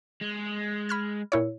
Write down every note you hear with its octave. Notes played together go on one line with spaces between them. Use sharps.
G#3
B5 F6 G#6
A#2 E4 C#5